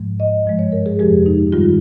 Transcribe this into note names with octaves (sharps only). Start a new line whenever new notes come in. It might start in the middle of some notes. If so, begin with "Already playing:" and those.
Already playing: G#2 F3 G#3
D#5
G2 F3 G#3
C#5
A#4
G#4
F2 C3 F3 G#3 G4
D#4
G2 D#3 G3 F4